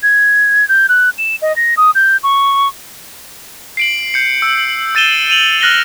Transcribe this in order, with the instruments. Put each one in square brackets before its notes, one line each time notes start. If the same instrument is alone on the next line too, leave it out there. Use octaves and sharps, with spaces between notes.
[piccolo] G#6
G6
F#6
E7
D#5
A#6
D#6
G6
C#6
[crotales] C7 D7 F#7
G6 C#7
E6
E6 A6 D#7 E7 G7
D#7 F7 F#7
F6 F#6 A#6 F#7 G7